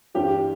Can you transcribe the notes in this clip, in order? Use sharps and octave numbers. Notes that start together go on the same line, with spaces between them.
G2 E3 G3 G4